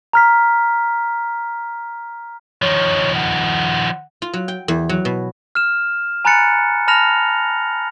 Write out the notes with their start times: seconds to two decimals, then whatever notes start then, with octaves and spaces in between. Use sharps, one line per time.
0.13 A#5 F6 B6
2.62 D#3 F3 C#5
3.14 F#5
4.22 F4
4.33 F#3
4.48 G5
4.68 E2
4.89 F#3
5.05 B2
5.55 F6 E7
6.25 G#5 A#5 B5 F#6 A6 C#7
6.88 A5 B5 F6 A#6 F7